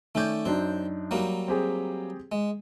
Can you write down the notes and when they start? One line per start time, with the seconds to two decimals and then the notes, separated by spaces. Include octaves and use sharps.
0.15 D#3 A3 C#4 D5 G6
0.45 F#2 C4 D4 D#4
1.11 F#3 G3 A#3
1.48 C4 G4 G#4
2.32 G#3